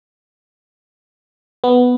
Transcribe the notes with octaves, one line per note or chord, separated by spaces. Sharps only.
B3